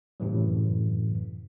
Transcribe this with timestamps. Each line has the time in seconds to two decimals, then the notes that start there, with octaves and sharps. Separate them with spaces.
0.20 F#2 A2 C3 E3 F#3